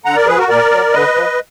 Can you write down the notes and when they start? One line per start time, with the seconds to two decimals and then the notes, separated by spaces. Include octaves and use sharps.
0.05 D3 F#5 A#5
0.16 A#4 D5
0.27 F3 G#4 B4
0.38 F#4 A#4
0.49 A#2 A#4 D5
0.72 F#3
0.93 D3 B4 D#5
1.15 F3